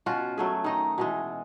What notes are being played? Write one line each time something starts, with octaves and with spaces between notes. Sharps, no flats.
B2 C#4 F4 F#4
F#3 A3 G#4
D#3 D#4 D#5
B2 E3 G#3